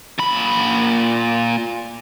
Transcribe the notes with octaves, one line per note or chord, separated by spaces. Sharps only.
A#2 B5